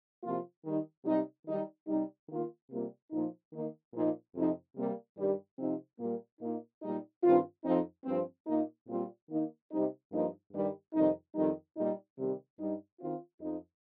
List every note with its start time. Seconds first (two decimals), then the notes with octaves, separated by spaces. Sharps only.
0.23 C3 F3 A#3 F4
0.64 D#3 G3 D#4
1.05 C3 G3 D#4
1.46 D#3 G3 D#4
1.87 C3 G3 D#4
2.29 D#3 A#3 F4
2.70 C3 G3 A#3 F4
3.11 A#2 F3 D#4
3.53 D#3 A#3 D#4
3.94 A#2 F3 A#3 D#4
4.35 F2 C3 F3 D#4
4.76 C3 G3 A#3
5.17 G2 D#3 G3
5.59 C3 F3 C4 D#4
6.00 A#2 G3 A#3
6.40 A#2 A#3 D#4
6.82 A#2 G3 D#4
7.23 G2 D#3 C4 F4
7.64 F2 F3 C4 D#4
8.05 G2 F3 C4
8.46 A#2 A#3 D#4
8.88 A#2 G3 C4 F4
9.29 D#3 A#3 D#4
9.70 C3 G3 C4 D#4
10.11 G2 F3 A#3 D#4
10.53 G2 D#3 G3
10.94 F2 C3 D#3 G3 D#4
11.35 F2 D#3 G3 D#4
11.76 A#2 G3 D#4
12.18 C3 D#3 G3
12.59 G2 G3 D#4
13.00 D#3 C4 F4
13.41 F2 F3 D#4